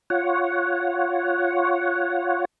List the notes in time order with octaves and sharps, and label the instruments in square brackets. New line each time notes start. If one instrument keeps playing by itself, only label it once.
[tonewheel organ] F4 C#5 F#5